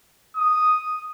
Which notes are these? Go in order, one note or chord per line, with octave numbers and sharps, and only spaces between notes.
D#6